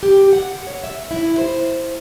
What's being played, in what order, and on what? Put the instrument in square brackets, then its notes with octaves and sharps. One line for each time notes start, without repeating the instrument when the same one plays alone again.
[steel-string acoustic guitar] G4
F#5
C#5
E5
E4
C5